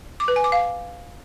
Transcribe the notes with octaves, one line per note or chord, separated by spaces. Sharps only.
D6
B4
G#5
D6
F5